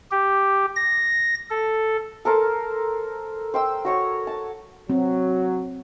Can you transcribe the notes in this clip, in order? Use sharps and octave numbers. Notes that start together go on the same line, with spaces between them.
G4
A#6
A4
A4 A#4 C5 A5
C5 G5 E6
F#4 C#5 C#6
A5
F#3 C4